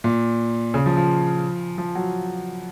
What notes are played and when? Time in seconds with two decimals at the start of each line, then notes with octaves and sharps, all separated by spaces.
0.04 A#2
0.74 C#3
0.86 F3
0.97 F3
1.78 F3
1.95 F#3